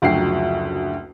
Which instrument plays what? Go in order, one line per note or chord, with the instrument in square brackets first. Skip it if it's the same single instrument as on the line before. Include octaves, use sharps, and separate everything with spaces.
[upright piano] F#1 D2 F3 F#3 G5 C7